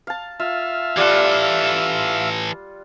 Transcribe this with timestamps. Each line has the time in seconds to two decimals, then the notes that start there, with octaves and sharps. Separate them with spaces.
0.07 F5 A5
0.40 F4 E5 F5
0.97 E3 G3 F4 A4 F#5